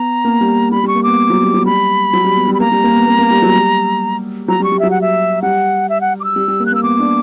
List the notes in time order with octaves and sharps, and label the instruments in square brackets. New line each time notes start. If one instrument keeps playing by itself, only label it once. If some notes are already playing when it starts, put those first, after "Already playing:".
Already playing: [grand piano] B3 [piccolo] A#5
[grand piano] A#3
G3
[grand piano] G3 [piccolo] B5
[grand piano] G3
[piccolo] C#6
[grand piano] A#3
[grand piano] B3 [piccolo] D6
[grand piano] F#3
G3
F#3
[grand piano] G3 [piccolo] B5
[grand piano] F#3
G3
B3
G3
[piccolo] B5
[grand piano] A#3 [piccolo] A#5
[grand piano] G3
A#3
B3
A#3
A#3
G3
F#3
G3
[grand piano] F#3 [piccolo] A#5
[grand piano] G3
[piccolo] C#6
[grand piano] G3
[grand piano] F#3 [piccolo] E5
[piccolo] F#5
E5
[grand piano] G3 [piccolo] F#5
[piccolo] E5
F#5
D6
E6
[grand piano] G3
G3
A#3
[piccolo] F#6
[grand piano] A#3
[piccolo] E6
[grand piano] B3 [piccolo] D6
[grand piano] D4